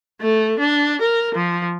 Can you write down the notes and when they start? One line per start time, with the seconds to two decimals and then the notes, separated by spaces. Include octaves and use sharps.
0.20 A3
0.58 D4
1.00 A#4
1.34 F3